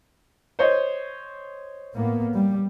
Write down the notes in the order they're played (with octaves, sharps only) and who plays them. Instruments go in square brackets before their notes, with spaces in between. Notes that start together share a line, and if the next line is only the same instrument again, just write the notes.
[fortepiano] C5 C#5 D#5
[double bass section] A2 A#3 B3
G3